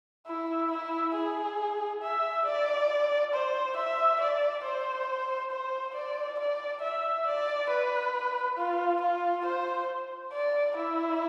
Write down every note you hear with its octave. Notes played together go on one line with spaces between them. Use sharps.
E4
E4
G#4
E5
D5
C5
E5
D5
C5
C5
D5
D5
E5
D5
B4
F4
F4
C5
D5
E4